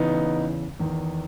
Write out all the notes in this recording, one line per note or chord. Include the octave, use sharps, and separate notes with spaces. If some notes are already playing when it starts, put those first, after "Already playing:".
Already playing: E2 C#3 E3 B3 D#4
E2 D#3